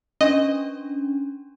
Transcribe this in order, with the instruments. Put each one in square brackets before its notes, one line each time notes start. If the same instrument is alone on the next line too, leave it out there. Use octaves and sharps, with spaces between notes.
[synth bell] C#4 D4 [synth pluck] D#5